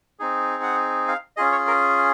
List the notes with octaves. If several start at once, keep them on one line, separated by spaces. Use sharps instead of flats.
C4 D#4 G#4
F#5
F5
C#4 F4 G#4 D#5
C#5
A#4